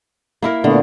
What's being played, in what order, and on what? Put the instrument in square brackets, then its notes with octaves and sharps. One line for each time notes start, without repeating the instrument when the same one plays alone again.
[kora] A#3 E4 A#4
[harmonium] A#2 A3 B3 [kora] D3